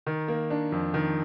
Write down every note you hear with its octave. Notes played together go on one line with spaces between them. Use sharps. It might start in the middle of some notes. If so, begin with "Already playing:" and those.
D#3
A#3
D4
F2
D#3